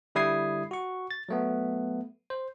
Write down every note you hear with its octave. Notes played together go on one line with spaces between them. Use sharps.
D3 G3 E4 D#6 G#6 C7
F#4 C#6
A6
F#3 A3 B3
C5